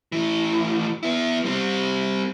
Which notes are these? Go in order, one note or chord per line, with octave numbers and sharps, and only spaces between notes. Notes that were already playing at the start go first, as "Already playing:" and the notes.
A2 E3
B3 E4
G3 C4